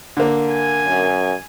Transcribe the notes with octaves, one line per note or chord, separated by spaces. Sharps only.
D3 A#3
G#5
F#2